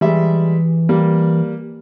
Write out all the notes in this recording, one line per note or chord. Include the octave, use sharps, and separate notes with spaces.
E3 G3 G#3 E5
G3 A#3